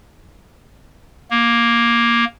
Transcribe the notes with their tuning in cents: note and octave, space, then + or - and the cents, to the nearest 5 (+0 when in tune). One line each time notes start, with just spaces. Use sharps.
A#3 +10